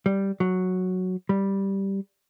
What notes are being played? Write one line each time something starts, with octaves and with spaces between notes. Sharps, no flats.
G3
F#3
G3